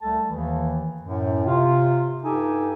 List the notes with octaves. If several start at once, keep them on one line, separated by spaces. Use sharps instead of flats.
C2 G3 A3 A4 A5
D#2 D#3 E3
F#2 A2
C3 F4
G2 D#4 G4 A4 G#5